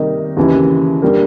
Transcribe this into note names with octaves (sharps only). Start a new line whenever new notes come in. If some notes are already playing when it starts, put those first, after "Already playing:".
Already playing: C3 D#3 G3 A#3 D#4
D#2 C#3 E3
D3 G3 A#3